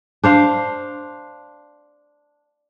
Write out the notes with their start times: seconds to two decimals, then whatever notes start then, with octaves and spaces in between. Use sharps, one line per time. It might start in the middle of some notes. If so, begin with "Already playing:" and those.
0.24 D4 C5 F5